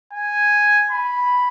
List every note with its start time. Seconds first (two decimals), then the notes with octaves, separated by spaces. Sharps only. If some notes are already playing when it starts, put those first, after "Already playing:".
0.13 G#5
0.91 B5